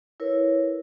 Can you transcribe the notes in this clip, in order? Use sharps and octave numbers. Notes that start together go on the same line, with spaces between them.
E4 A#4 B4 C#5